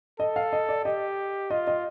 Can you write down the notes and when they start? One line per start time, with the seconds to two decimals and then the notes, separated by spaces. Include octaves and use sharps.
0.20 A4 D#5
0.36 F5
0.53 D#5
0.69 D5
0.84 G4 D#5
1.50 F4 D#5
1.67 D#5